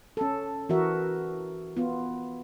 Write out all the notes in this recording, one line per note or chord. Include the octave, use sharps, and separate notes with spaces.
C#4 A4
E3 F#4 A#4 E5
B3 F4